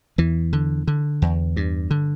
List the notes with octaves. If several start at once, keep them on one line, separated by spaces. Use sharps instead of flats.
E2 E3
D3
D3
E2
G2
D3